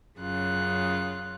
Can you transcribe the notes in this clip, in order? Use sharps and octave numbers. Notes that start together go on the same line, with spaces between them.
F#2 C#3 F4 F#6